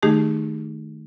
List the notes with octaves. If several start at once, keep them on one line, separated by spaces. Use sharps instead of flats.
D#3 A3 D#4 G4 G#4